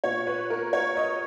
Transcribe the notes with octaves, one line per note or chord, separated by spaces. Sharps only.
A#2 C#5
B4
A#4
C#5
D#5